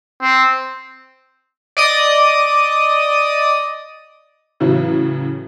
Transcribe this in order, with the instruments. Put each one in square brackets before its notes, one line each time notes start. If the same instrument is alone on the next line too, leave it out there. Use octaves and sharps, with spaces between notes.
[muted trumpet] C4
[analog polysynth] D5 D#5 D#6
[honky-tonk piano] A2 C#3 E3 F#3